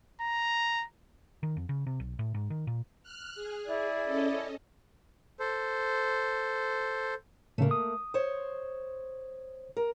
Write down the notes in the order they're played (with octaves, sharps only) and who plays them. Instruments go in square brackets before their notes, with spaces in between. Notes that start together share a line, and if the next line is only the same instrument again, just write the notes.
[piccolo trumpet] A#5
[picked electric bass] D#3
F2
C#3
C3
B1
A2
G#2
D#3
A#2
[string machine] F6 F#6
G#4
[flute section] E4 D5
[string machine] C#4 A4 D#5
[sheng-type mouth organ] A4 C5
[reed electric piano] A2 C#3 [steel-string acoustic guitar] A3 A#3
[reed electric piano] D#6
[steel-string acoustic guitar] C5 C#5
A#4